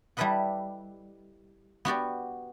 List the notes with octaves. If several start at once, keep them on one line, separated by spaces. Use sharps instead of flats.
G3 E4 A4 B4 D#5 F#5
B3 F#4 G4 D5